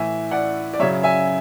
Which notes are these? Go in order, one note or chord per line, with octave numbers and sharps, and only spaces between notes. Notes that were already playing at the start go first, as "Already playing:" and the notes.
Already playing: A2 E3 E5 G#5
D5 F#5
D5
F#2 C#3 F#3 C#5 E5
E5 G#5